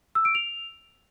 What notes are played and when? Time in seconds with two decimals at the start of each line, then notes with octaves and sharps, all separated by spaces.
0.15 E6
0.25 D7
0.35 F7